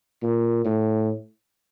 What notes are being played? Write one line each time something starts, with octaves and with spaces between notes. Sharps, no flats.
A#2
A2